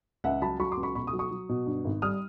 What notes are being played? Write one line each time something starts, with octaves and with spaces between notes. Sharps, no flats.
C#2 E5 F#5
F#3 A5 B5
F#3 B5 C#6
C6 D6
C#2
B5 C#6
B2 B5 C#6
C#6 D#6
F#3
C#6 D#6
F#3
B2
G2
G#1
G3 D#6 F6